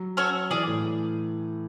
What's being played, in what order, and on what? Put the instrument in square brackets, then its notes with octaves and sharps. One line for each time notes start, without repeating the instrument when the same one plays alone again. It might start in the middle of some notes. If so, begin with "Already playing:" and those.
Already playing: [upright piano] F#3
[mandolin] C#4 F#4 A4 C#5
[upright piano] E3 [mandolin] C#4 G#4 D5
[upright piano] A2